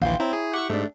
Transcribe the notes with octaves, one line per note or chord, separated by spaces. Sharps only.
A#1 D#2 E3 F5 G5 C6
C4 E4 C#5 A#5
G#4
G4 F#5 C#6 E6
G#2 A3 D4